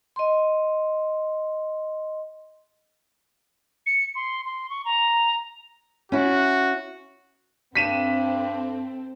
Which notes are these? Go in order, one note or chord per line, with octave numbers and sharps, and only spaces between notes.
D#5 C6
C#7
C6
C6
C#6
A#5
C#4 E4 F#4
G2 C4 A4 B6 D#7 E7